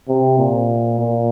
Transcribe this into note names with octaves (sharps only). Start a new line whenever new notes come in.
C3
A#2
A#2